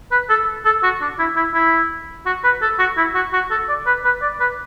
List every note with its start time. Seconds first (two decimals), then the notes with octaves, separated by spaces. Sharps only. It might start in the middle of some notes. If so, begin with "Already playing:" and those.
0.11 B4
0.29 A4
0.65 A4
0.83 F#4
1.01 D4
1.19 E4
1.36 E4
1.54 E4
2.25 F#4
2.44 B4
2.62 A4
2.79 F#4
2.97 E4
3.14 F#4
3.33 F#4
3.51 A4
3.69 D5
3.86 B4
4.04 B4
4.22 D5
4.40 B4